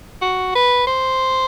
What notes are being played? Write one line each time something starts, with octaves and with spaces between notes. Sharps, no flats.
F#4
B4
C5